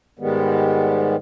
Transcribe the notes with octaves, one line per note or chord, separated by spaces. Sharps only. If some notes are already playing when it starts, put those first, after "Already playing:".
G#2 D#3 G3 G#3 B3